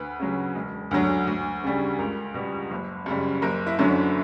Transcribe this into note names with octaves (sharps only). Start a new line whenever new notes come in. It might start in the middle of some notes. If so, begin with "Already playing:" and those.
Already playing: D2 B4
C#3 F#3
E1
D2 D3 F#3
D2
C#3 G3
C#2 A#4
B2 G3
F#1
F#2 C#3 G3
F#1 A#4
E4
F#2 D3 F#3